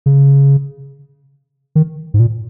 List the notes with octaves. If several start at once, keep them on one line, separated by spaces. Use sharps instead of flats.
C#3
D#3
G#2
A#2